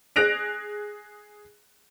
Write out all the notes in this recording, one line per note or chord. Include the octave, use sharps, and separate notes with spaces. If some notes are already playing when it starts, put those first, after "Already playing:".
G#4 F#6 A#6 D7 F7